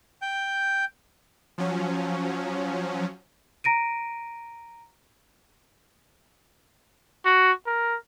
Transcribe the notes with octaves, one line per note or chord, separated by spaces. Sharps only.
G5 G6
F3 F#3 C#4
A#5 A#6 D7 D#7
F#4
A#4